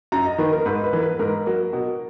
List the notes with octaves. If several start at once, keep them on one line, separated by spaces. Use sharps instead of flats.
F#2 A#5
D#5
D#3 A#3 B4
A#4
G#2 B4
B4
E3 A#3
B4
G#2 A#4
F#3 A#3
B2